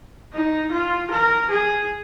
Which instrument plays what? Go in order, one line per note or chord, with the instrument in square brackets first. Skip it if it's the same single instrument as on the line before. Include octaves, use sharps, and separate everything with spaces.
[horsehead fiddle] D#4
F4
A#4
G#4